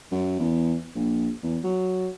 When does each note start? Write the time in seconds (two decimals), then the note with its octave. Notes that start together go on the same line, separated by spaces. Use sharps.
0.11 F#2
0.39 E2
0.95 A#1
1.43 E2
1.64 F#3